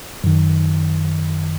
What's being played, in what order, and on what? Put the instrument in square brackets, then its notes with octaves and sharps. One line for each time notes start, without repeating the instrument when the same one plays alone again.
[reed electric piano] F#2 D#3